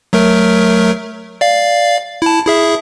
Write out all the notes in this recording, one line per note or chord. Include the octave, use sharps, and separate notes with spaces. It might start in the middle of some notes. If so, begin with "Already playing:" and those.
F#3 A3 A#4
D5 F5
E4 A5
E4 G#4 E5